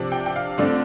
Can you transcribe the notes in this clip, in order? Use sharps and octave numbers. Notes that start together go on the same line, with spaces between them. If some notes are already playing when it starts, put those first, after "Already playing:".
Already playing: C3 F3 D4
G5
G5
F5
D3 A3 C4 F4 D5